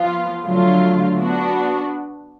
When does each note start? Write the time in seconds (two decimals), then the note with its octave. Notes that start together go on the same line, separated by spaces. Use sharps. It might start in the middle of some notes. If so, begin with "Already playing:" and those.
Already playing: F3 B3 F4
0.45 D3 F#3 A3 F4
1.18 B3 D4 F#4